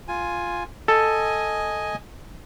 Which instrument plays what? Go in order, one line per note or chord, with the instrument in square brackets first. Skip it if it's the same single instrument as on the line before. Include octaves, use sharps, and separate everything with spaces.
[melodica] F4 G#5
[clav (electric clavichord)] A4 [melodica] D#5 G#5